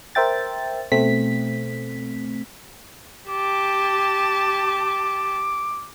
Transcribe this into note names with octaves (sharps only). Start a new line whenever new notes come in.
A#4 C5 E5 G5 A6
B2 A3 C4 B6
G4 A5 D6